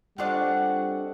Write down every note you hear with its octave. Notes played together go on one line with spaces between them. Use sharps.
G3 C4 D4 F4 A4 D#5 F#5 C#6